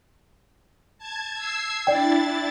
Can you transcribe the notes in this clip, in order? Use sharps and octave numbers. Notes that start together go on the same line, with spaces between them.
A5 G#6
E6 G#6 C7
D4 E4 D5 G5 A6